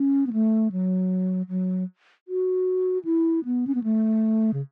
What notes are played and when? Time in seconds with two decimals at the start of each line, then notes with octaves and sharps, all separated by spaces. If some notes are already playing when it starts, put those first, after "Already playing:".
Already playing: C#4
0.27 B3
0.33 A3
0.72 F#3
1.49 F#3
2.28 F#4
3.05 E4
3.45 B3
3.67 C#4
3.75 B3
3.84 A3
4.53 C#3